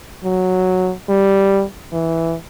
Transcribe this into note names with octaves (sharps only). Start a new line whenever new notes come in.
F#3
G3
E3